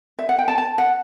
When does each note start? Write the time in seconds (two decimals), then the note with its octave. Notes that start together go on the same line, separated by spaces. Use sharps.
0.19 E5
0.29 F#5
0.39 G5
0.48 A5
0.58 A5
0.78 F#5